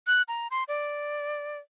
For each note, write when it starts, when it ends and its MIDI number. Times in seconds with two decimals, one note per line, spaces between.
0.07 0.22 90
0.28 0.47 82
0.51 0.64 84
0.68 1.58 74